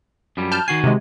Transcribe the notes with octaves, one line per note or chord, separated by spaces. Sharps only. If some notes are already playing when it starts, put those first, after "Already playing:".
F#2 F3 G3
A5 F6 G6
D#3 F#4 G#5 C7
C3 G#3